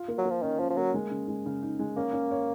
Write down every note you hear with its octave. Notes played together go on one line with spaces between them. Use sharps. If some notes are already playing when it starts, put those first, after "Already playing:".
Already playing: F4
A#3
F#3
A#3
F3
D#3 C#4
F3 C#4
F3
F#3 A#3
G#3
C#3
G#3
C#3
D#4
G#3
A#3 C#4
C#4
C#5